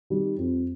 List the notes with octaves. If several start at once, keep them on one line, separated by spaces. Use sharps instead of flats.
D#3 G3
F2